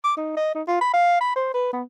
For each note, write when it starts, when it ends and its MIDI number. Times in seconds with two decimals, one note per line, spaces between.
0.04 0.13 86
0.17 0.37 63
0.37 0.52 75
0.55 0.62 63
0.67 0.77 65
0.81 0.92 83
0.94 1.20 77
1.20 1.35 83
1.35 1.49 72
1.54 1.69 71
1.73 1.83 59